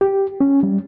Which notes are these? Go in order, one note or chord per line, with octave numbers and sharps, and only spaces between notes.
G4
C#4
G3